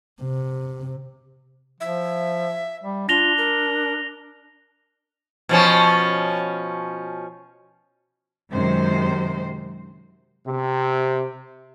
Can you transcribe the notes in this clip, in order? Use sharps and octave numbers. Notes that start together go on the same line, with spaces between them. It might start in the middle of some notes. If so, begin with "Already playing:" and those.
C3
F3 E5
G3
D4 F4 A#6 F7 G7
A#4
B2 F3 C#4
F#2 C3 D#3 G#3 C5
C3